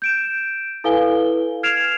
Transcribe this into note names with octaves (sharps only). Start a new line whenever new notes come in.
G6 D7 E7
E4 A4 B4 F5 G#5 G7
F6 G#6 C7 D7 E7 F7